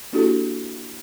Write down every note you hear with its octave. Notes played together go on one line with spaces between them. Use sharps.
A#3 D4 E4 F#4 G4 A4